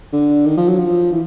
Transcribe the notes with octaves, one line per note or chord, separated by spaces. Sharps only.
D3
D#3
F3
F#3
F3
E3